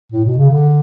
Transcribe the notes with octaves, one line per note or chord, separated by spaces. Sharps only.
A2
B2
C#3
D3